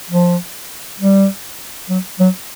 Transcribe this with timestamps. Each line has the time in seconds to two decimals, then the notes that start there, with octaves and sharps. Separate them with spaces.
0.10 F3
0.99 G3
1.89 F#3
2.20 F#3